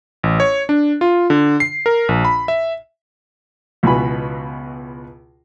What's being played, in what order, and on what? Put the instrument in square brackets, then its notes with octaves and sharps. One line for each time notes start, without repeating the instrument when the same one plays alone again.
[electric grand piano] A1
C#5
D4
F4
D3
C7
A#4
A#1
B5
E5
[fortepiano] C#2 B2 E3 F#4 G#5 B5